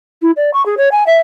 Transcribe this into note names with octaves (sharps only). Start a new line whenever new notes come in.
E4
D5
C#6
G#4
C#5
G#5
E5